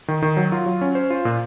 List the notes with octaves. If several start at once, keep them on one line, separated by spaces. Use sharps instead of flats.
D#3
D#3
F#3
F4
F#3
C#4
C5
F4
A#2